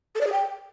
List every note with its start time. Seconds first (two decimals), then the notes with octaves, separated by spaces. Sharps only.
0.15 A4
0.20 D5
0.26 G#4
0.32 G5